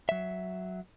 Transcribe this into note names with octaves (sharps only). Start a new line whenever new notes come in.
F#3 E5